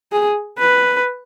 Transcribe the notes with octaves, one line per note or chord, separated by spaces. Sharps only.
G#4
B4